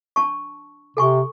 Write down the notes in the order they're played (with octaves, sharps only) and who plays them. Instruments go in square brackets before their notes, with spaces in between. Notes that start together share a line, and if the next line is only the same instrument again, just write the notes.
[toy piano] D4 A5 C#6
[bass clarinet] C3 [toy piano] A4 G#5 C#6